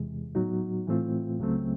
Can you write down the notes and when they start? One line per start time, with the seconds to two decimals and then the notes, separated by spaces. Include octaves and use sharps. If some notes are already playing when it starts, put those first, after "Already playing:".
Already playing: E2 C3 E3 G#3
0.35 A2 F#3 B3 D#4 F#4
0.87 A2 E3 A3 C4 F4
1.39 C#2 C#3 F#3 A3 C4